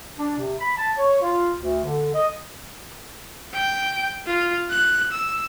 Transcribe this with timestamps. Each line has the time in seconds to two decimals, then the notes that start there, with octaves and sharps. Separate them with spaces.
0.18 D4
0.39 C3
0.59 B5
0.77 A5
0.98 C#5
1.22 F4
1.58 D2
1.84 D3
2.14 D#5
3.53 G5
4.26 F4
4.70 F#6
5.12 E6